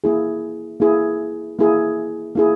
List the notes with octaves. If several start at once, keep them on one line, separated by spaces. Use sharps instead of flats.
A#3 E4 G#4
A#3 E4 G#4
A#3 E4 G#4
A#3 E4 G#4